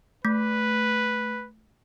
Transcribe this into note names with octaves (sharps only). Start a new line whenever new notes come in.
A3 B4